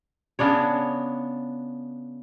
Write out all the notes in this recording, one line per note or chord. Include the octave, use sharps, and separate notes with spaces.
C#3 B3 D4 C#5